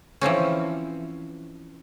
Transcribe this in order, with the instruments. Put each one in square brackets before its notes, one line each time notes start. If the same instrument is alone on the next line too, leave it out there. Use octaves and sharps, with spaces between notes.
[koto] E3 F3 C4 C#4